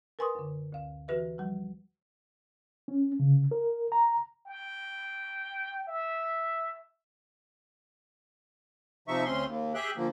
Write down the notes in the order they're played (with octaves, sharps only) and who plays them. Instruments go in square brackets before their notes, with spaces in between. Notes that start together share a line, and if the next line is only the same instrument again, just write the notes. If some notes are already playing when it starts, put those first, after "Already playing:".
[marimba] A#4 B4 G#5 C6 C#6 D#6
F#2 D3
D2 F5
E3 F#4 G4 B4 E5
F3 G3
[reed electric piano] C#4
C#3
A#4
A#5
[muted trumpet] G5
E5
[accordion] C3 F3 D#4 E5 C#6
D2 C4 C#4 C6
D#2
G4 G#4 E5 G5 F#6
A#2 D3 F3 A#3